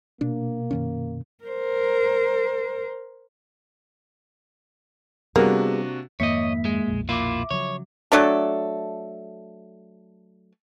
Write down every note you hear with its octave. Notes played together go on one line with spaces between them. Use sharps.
B2 A#3 D4
F#2 D#3 C#4
A#4 C5
C3 G3 A#3 B3 D4 F#4 G#4
F2 G#2 D#3 A#3 C#5 D#5 E5 B6
G#3
B1 F2 A#2
A#3 E4 F4 E5 D6
C#3 F3 F#3 C#5
F#3 A3 D4 A4